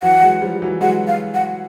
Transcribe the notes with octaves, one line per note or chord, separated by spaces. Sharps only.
E3 F#3 F#5
F#3 G#3
F3 G3
E3 F#3
F#3 G#3 F#5
F5
F#5